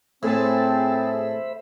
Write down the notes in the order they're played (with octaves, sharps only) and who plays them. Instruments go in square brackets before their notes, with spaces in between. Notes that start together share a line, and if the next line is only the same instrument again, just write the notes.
[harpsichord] A2 [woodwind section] C4 [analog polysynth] G#4 A4 A5 [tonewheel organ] C5 E5 B5